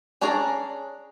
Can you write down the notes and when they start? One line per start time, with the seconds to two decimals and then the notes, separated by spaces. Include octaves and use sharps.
0.21 C#4 D4 G#4 D5 A#5